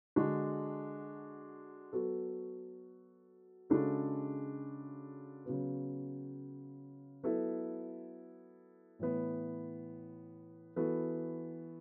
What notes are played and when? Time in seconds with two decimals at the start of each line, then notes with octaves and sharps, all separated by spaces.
0.16 D3 G#3 D4 F#4
1.93 F#3 B3 F#4 A4
3.70 C#3 G#3 D4 F#4 A4
5.46 C#3 F#3 B3
7.23 F#3 B3 E4 A4
8.99 A2 E3 B3
10.76 E3 B3 F#4 A4